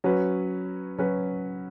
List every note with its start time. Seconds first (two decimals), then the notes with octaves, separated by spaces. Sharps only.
0.04 F#3 C#4 F#4 B4
0.98 F#3 C#4 F#4 B4